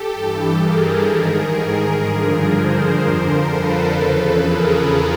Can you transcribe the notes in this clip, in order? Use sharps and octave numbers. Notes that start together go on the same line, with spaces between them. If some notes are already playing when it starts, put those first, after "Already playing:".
Already playing: G4 A4
G2 E3
G#4 A#4
G#2 D#3
G#4 A#4
G2 D3 F3
A#4 C5
F2 D3 F3 A#4 C5
A4 B4
E2 C#3 F3
G#4 A#4